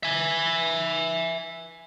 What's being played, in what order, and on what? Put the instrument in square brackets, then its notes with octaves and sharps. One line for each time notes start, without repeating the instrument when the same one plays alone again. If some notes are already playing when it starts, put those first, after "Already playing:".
[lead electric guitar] E5 G#5